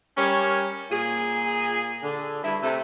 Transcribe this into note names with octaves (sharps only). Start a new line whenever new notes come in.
G3 C#4 A#4 C#5
A#2 G#4
D3
G2 E4
C3 A3